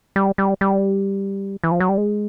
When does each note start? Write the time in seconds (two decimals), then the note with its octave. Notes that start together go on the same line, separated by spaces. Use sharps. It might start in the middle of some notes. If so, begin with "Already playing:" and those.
0.16 G3
0.38 G3
0.61 G3
1.64 E3
1.71 F3
1.80 F#3
1.89 G3
1.98 G#3